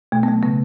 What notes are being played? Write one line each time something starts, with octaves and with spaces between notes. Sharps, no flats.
B2 A3
B3
F#3 A3
C#3 B3